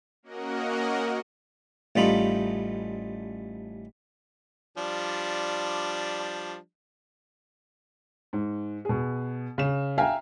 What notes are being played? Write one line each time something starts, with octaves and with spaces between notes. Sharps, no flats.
A#3 C#4 F#4 A#4 D#5 F#5
A1 G3 A3 D#4 F4 B5
F3 G3 D4
G#2
B2 G#4
C#3 E7
E5 F5 G5 G#5 A#5 F6